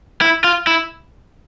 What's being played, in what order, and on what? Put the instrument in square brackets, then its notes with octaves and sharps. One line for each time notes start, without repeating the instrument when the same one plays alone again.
[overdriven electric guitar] E4
F4
E4